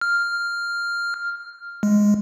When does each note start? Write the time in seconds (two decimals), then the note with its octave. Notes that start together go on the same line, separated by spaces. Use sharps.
0.01 F6
1.83 G#3